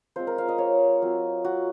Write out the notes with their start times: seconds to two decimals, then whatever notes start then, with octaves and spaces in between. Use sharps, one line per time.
0.16 G#3 C4 F4 C5
0.27 A#4
0.38 F5
0.48 D#5
0.58 C#5
1.02 F#3 C4 F4
1.44 F#4